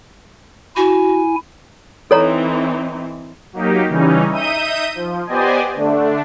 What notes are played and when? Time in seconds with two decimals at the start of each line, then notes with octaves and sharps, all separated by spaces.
0.76 E4 F#4 G#5
2.11 E3 C4 D#4 A4 C#5 A#5
3.53 F#3 A#3 D#4 G4
3.88 C#3 E3 G3 C#4 D#4
4.30 D#4 E5 D#6 G6 D#7
4.95 F3
5.27 B3 G4 C5 D5 D#5 G#5
5.75 D3 A3 D4